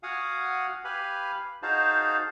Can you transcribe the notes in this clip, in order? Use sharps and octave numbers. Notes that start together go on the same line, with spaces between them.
F#4 F5 F#5 G#5 D#6
G4 B4 F5 G#5 B5
D#4 F#4 G#4 C5 F5 A5